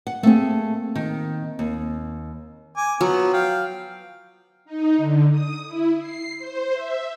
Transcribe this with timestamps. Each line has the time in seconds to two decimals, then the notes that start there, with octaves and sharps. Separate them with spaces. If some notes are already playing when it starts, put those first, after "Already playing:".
0.07 F#5
0.23 A3 A#3 C4 G#4
0.95 D#3
1.59 D#2
2.77 G#5 D6
3.01 F3 F#3 B3
3.33 F5 G5
4.65 D#4
4.97 D3
5.30 D#6
5.66 E4
5.98 C7
6.39 C5
6.73 E5